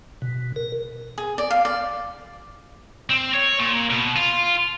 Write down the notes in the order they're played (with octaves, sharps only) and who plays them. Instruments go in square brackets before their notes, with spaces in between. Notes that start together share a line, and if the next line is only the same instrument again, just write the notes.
[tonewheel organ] B2
A#4
[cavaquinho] G#4
D5
F5
D5
[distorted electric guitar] C4
C#5
A#2
B2
F4